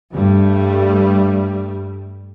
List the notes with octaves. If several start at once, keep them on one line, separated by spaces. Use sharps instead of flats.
G2 G3 A3